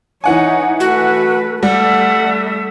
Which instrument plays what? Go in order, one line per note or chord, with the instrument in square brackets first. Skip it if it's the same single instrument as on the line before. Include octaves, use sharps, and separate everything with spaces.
[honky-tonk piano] E3 F#5 G#5 [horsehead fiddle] D#4 C#5
[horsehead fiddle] A3 B4 [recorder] F#4
[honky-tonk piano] G3 [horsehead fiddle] A3 E5 [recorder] F#5